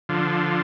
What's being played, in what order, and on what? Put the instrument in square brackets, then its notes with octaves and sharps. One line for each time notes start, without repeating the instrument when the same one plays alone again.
[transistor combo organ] D3 F3